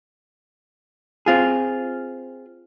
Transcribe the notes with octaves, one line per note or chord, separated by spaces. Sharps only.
C4 F4 G#4